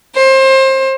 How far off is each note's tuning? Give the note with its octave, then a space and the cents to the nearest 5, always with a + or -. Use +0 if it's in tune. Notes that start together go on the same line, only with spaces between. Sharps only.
C5 +30